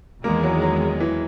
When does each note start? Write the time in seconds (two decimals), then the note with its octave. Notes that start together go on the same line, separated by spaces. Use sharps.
0.23 E2 D#3 G#3 A#3
0.43 F#3
0.62 F#3
1.00 E3